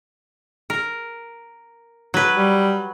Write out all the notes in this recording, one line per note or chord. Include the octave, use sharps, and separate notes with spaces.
A#4
F#3 B4
G3